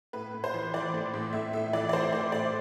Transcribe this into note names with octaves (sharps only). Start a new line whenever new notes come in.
A2 B4
A2
C5
E3
E3 D5
A2
A2
A2 E5
A2 E5
E3 D5
D5
E3 C5
A2 D5
A2 D5